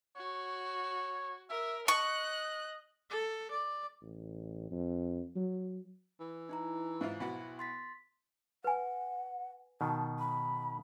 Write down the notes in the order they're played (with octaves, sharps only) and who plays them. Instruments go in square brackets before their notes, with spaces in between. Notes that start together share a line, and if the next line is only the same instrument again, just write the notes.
[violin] F#4 [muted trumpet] C#5
[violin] A#4 [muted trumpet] E5
[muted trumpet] D#5 [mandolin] C#6 [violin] F#6
[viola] A4
D5
[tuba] A1
F2
F#3
[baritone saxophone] E3
[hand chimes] D#4 E4 A#5
[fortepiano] G#2 E4 F4 [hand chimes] F5
[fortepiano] B1 B3 F#4 [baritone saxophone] E4
[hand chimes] C6 A6 B6
[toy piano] B4 G#5 [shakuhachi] F#5
[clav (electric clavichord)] B2 D#3 [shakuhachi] A5
[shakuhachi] B5